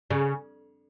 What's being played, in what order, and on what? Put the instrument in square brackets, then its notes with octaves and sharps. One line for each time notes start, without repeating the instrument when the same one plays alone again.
[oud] C#3